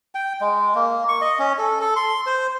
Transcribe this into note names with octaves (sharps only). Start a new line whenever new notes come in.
G5
G#3
A#3
C#6
D#5
C#4
A4
A4
C6
C5